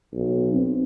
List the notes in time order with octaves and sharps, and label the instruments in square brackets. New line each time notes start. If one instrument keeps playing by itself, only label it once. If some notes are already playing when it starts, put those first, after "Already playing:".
[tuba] B1
C4